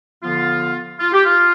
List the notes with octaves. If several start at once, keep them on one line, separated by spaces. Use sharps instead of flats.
D3 F3 B3 F4
F4
G4
F4